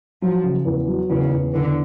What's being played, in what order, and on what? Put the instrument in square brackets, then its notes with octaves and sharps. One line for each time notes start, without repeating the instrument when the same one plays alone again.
[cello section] F3 [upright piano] F#3
[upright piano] C#3
E2
F#3
[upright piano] E2 [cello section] C#3
[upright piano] E2
[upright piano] E2 [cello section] D3